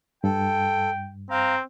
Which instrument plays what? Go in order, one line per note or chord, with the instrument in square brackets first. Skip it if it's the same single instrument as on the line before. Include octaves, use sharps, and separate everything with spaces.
[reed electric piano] G2 [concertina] A4 [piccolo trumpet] G5
[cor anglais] C4 [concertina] F5 [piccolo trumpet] A#5